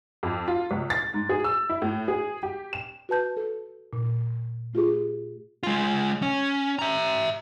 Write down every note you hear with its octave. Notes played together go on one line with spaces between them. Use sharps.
F2
F4
C#2
A6
G#2
G#4
E6
E4
A2
G#4
G4
E7
F#4 B4 A5 G6
A4
A#2
A3 F4 G4 G#4
G#3 F4
C#4
E5 A#5